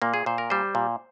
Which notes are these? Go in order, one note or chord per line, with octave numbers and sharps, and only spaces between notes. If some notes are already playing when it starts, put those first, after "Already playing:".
A#2 A#3
G#4
A#2 C5
A#4
G3 C5
A#2